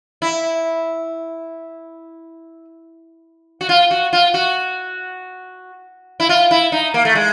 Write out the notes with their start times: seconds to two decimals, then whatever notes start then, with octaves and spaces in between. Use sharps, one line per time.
0.22 E4
3.61 F#4
3.69 F4
3.91 F#4
4.13 F4
4.34 F#4
6.20 E4
6.29 F4
6.51 E4
6.72 D#4
6.94 A#3
7.05 A3
7.15 G#3